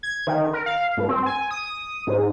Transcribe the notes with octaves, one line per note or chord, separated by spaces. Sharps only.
G#6
D#3
A#4
F5
G2
C4
G#5
D#6
G#2